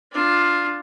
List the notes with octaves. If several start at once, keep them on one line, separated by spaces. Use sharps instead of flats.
D4 F4